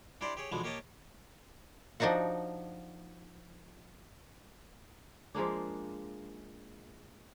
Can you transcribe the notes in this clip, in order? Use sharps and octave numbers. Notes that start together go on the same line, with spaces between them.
D4 E4 G4 C5 D5
G4 G#4 C#5
B2 D3 E3 F3 G#3 B3
A#3 G4 C#5 D#5 A5
F3 D4 D#4 F#4 F#5
F3 G#3 A#3 D4